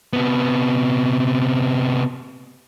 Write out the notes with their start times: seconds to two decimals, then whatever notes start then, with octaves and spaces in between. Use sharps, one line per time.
0.13 C3 B3